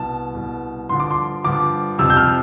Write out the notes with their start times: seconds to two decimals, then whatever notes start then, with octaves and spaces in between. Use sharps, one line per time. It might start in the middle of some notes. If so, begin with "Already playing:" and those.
Already playing: C2 B2 A5
0.35 C2 B2
0.89 G2 D3 F3 C6
1.00 D6
1.11 C6
1.45 G2 D3 F3 D6
1.98 F2 C3 F3 E6
2.10 G6
2.17 F6